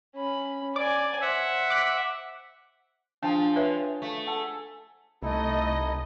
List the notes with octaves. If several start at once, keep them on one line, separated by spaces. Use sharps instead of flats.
C#4 B5
D5 G#5 D6
C5 E5 F#5
D6 F#6 B6
F3 D4 G#4 G5 A5
B4 C#5 E5
A3
G#4 A4 F#5 A5
C2 A3 D#4 E4 A4 D#5